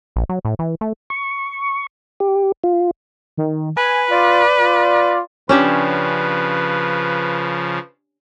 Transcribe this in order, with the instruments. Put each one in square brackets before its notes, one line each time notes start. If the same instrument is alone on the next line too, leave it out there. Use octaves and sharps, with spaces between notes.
[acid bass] A#1
F#3
A2
E3
A3
[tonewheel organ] C#6
G4
F4
[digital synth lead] D#3
[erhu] B4 [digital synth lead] G#5
[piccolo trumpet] F4 [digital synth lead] D5
[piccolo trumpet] F4
[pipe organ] C#3 F3 [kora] C#4 D4 G4 [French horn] B4